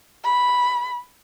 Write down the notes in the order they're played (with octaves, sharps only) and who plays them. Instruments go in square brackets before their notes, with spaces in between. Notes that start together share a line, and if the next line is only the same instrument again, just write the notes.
[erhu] B5